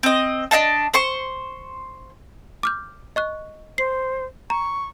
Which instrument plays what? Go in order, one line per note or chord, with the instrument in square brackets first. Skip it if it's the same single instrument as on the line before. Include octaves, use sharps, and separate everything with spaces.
[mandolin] C4 D#5
D4 D#5 F5 A5
C5 C6 C#6
[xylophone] D6 F6 G6
D#5 C#6 F#6
[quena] C5 [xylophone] C7
[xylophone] A#5 [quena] C#6